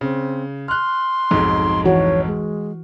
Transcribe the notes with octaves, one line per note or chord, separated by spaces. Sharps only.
C#3 C4
C6 F6 F#6
B1 F2 G#2
E3 F#4 C#5
G#3